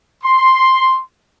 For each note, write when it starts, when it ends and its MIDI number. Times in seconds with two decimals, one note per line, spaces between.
0.23 1.00 84